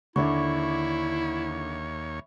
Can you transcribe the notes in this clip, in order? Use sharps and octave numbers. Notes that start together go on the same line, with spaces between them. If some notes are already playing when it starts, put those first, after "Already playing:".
D#2 D3 D4 E4 C#5 E5 B5 C#6